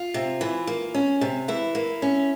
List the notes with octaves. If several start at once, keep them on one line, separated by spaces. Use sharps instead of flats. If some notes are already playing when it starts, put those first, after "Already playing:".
Already playing: F4
C3
E3
A#3
C#4
C3
E3 E4
A#3
C#4